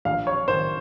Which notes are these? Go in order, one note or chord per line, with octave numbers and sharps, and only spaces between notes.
A#1 F5
C#5
D#3 C5